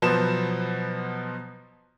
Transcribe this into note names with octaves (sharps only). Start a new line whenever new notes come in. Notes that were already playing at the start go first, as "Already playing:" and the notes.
B2 F3 F#3 B3 C5 E7